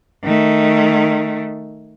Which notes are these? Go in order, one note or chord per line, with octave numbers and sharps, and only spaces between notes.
D#3 A3